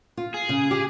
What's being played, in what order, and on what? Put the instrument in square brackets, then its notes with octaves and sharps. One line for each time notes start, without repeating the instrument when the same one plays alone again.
[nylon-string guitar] F4
[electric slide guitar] G#4
[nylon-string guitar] C#3
G4